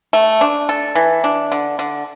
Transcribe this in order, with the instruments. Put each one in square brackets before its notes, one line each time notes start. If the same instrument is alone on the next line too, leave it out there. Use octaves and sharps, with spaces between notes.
[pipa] A3
D4
A4
E3
D4
D3
D3